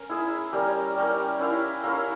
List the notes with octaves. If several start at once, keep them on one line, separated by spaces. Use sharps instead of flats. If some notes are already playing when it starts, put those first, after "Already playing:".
Already playing: C#4 A#4
E4 G#4 E5
G3 C#4 G4 A#4
G3 C#4 G4 A#4
C#4 E4 A#4 F5
C#4 E4 A#4 F5